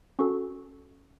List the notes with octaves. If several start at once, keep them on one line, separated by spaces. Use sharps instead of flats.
C#4 F#4 A4 C#6